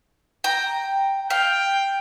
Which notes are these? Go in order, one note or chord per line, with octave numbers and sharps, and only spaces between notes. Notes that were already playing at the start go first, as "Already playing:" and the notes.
G5 A#5
F5 G5